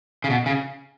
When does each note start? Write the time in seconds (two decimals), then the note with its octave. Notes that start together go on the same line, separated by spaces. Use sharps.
0.24 C#3
0.30 B2
0.46 C#3